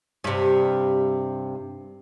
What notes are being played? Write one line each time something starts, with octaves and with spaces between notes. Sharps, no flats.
G2 C3